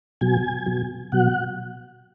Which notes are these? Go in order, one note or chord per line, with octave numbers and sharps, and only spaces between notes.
B2 F#3 G#5
B2 F#3
B2 F#3 F#5